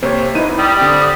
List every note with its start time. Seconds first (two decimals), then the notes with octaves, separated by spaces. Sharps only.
0.03 C3 A#3 C5 C#5
0.35 D#4 E4 B4 D#7
0.58 G3 D#6
0.80 D3 C4